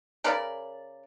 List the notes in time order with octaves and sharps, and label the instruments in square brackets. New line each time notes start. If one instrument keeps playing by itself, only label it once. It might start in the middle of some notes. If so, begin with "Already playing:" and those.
[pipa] C#3 A#4 B4 D5